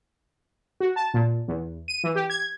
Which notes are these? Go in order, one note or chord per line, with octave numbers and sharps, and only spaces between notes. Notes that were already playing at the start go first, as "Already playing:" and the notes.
F#4
A5
A#2
E2
D#7
E3
G4
G#6